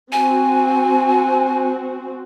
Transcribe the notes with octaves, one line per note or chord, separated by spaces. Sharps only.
C4 F#4 G#5